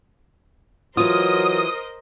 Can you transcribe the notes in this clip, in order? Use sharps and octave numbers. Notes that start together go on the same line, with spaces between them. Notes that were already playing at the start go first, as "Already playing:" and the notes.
E3 F#3 F4 A#4 C5 D#5 D#6